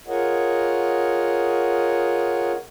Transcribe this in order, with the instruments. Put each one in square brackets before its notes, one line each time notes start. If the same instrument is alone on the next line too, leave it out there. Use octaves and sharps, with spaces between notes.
[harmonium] F4 G#4 A#4 C#5 D#5 F#5